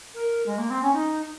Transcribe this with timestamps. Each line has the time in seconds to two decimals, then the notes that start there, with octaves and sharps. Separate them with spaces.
0.14 A#4
0.46 G#3
0.58 A#3
0.70 C4
0.82 C#4
0.94 D#4